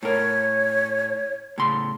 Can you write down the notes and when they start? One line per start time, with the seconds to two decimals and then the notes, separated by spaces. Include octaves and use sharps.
0.03 A2 A#4 C#5
1.58 A2 C#3 C6